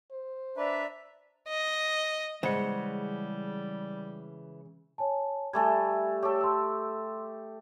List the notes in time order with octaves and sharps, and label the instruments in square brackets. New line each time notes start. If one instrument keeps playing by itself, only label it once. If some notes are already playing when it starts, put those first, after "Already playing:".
[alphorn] C5
[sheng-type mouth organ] D4 B4 [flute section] D5 E5 A#5
[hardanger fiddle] D#5
[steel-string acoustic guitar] C#3 [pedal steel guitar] E3 F#5 [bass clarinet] G3 [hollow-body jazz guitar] G#3 C5
[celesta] C#5 G#5 A5
[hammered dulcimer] G3 A3 A4 [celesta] G#5 G#6
[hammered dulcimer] G4 A4 [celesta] C#5 C#6
[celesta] C6 E6